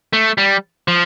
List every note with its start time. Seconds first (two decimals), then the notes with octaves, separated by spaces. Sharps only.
0.13 A3
0.38 G3
0.88 F3